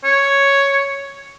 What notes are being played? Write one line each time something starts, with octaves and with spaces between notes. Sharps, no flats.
C#5